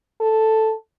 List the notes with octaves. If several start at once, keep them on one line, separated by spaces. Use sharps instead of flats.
A4